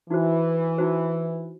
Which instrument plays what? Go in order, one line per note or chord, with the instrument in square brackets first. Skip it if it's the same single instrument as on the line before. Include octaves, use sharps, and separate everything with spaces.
[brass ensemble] E3 [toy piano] D#4 F#4 C5
[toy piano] D#4 F#4 C5